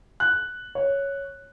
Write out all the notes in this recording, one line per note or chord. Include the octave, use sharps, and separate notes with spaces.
F#6
C#5